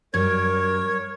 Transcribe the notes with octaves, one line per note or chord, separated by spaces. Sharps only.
F#2 G3 A#4 C#5 G#6